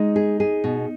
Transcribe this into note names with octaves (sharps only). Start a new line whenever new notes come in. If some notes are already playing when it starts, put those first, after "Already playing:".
Already playing: G#3 D#4
G#4
G#4
B2